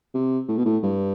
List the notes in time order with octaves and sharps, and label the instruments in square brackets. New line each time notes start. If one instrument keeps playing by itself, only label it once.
[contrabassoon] C3
A2
B2
A2
G2